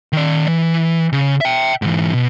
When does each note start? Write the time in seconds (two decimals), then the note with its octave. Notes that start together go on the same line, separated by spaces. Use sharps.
0.13 D#3 D5
0.48 E3
1.13 C#3
1.41 E5 G5
1.82 G#2 E3
2.14 B2